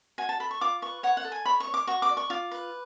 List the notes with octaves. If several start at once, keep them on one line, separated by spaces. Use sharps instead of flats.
F#4 G#5
A5
A4 B5
C#6
F4 D6
B4 C#6
C#5 F#5
F#5
A4
G#5
C#5 B5
C#6
C#5
D6
F#4 C#6
D6
D5
C#6
F4 D6
B4